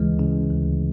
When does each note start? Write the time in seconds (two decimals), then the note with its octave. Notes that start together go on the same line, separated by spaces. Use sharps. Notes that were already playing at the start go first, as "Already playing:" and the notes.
Already playing: D2 C#3 E3 G#3
0.19 C#3
0.50 D2